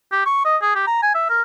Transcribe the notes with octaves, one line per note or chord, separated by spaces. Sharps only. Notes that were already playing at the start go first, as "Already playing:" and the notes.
G4
C#6
D#5
G#4
G4
A#5
G#5
E5
A#4